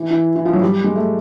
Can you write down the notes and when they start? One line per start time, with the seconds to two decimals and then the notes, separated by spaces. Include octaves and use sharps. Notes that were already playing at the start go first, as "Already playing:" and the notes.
Already playing: E3
0.10 E3
0.36 E3
0.45 F3
0.53 F#3
0.62 G3
0.84 G#3
0.96 A3